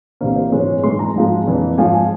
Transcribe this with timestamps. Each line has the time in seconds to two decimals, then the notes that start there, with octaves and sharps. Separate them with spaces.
0.21 C2 C3 E3 A#3 C5
0.36 C5
0.52 G#2 E3 G#3 C#5
0.84 G#2 E3 G#3 C6
0.99 A#5
1.15 G#2 F3 G#3
1.46 F2 E3 A#3
1.78 G#2 F3 G#3 G#5
1.94 G#5